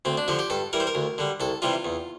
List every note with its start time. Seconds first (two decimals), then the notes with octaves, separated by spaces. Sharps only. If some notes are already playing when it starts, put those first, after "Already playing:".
0.05 D2 C4
0.17 D4
0.28 D3 F3 G4
0.39 G4
0.50 G2 A4
0.73 E3 G3 A#4
0.80 C5
0.87 A#4
0.95 D2
1.18 D3 G3
1.40 C2 A4
1.62 C3 E3 G3 F4
1.85 E2